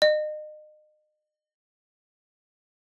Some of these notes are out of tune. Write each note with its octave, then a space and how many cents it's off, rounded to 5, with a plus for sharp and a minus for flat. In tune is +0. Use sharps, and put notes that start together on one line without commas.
D#5 -35